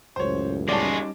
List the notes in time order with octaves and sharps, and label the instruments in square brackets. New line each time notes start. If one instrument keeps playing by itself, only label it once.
[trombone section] C#2 F#2 A2 [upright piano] C5 C#5
[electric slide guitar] G3 C#4 D#4 [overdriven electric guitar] G#3 F#4 [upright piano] D5 A5